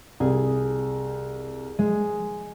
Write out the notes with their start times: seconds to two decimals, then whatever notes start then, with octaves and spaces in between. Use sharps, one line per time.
0.20 C2 G#4
1.79 G#3